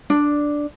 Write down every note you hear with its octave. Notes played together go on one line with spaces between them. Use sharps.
D4